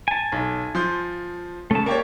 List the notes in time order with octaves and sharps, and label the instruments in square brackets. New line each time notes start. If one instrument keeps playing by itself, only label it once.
[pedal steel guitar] G#5 A5
[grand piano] B1
F3 C6 G6
[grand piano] C#3 [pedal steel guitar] A3 A5
[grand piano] A#3 G4 C#5 [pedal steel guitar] D5 C#6